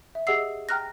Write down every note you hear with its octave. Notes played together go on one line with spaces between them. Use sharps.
E5
G4 G#4 D#5 F#5 E6 C7
G5 A#5 F6 F#6 A#6